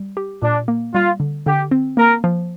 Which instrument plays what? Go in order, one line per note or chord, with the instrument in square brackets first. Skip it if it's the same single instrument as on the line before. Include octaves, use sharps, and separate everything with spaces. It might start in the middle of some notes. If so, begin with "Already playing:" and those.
Already playing: [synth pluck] G3
G4
[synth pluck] A#2 [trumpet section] D4
[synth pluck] A#3
[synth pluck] G3 [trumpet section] F4
[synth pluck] D3
[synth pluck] D3 [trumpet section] G4
[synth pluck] C4
[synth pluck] A#3 [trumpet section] A#4
[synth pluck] F3